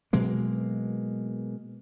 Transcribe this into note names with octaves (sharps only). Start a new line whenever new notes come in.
B2 F#3 G#3 A#3